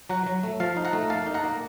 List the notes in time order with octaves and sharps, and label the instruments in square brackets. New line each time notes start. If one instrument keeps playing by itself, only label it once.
[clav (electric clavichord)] F#3 F#5 A#5
F#3
A3
F3 F5 A5
D#4
F#5 A#5
A3
A#3 F5 A5
D#4
F#5 A#5
A#3